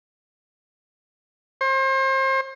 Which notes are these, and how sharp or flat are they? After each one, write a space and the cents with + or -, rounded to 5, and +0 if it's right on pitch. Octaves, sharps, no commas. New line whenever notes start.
C5 +35